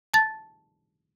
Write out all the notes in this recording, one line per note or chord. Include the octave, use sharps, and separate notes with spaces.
A5 A6